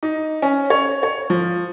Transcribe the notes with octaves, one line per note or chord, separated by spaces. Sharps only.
D#4
C#4
C#5
C#5
F3